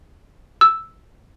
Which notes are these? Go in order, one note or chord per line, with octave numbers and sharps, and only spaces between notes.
E6